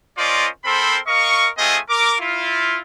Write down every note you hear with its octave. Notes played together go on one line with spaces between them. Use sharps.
C#4 F4 A#4 C5 D5 D#5
C4 A4 A#4 C5 B5 C6
A#4 D#5 F5 C#6
A3 C4 F4 G#4 D#5 G#5
A#4 D6
E4 F4